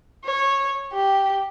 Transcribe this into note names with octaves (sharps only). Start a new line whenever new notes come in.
C#5
G4